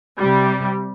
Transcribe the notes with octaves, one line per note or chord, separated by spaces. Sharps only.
C3 G3